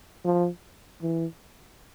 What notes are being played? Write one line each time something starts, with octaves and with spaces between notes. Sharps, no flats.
F3
E3